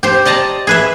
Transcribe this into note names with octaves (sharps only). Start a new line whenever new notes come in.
G4 C5
D5 D#5 A5 A#5
G#4 B4 E5